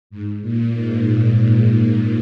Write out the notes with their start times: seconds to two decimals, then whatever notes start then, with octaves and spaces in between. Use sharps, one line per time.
0.10 G#2
0.41 A#2
0.73 G#2
1.04 A#2